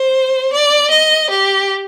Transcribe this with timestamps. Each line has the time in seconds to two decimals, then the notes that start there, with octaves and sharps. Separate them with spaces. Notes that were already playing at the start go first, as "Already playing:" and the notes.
Already playing: C5
0.51 D5
0.90 D#5
1.29 G4